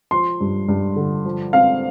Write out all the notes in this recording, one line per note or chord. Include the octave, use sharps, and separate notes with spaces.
F3 C6
G2
G2
D3
F3
C4 F5